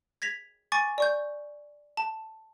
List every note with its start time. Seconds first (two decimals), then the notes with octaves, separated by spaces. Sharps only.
0.22 G#6 A#6 B6 F7
0.72 G#5 C#6 D6 A6
0.98 D5 C#6 G6
1.97 A5